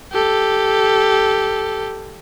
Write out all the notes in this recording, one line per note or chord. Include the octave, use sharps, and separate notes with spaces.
G4 A4